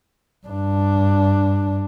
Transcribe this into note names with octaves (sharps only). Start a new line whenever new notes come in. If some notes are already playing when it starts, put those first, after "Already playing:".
G2 D4